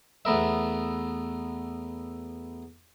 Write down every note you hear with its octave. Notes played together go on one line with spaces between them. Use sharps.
E2 A3 B3 A#4 E5